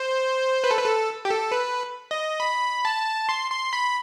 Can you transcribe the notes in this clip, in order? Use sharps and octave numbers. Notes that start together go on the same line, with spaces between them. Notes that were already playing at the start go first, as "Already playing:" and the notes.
Already playing: C5
B4
A4
B4
A4
G4
A4
B4
D#5
B5
A5
C6
C6
B5